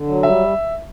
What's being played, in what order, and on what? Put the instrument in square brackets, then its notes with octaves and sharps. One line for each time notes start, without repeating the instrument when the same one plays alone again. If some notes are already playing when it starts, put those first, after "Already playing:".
Already playing: [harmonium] D3
F#3
[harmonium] G3 [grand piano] E5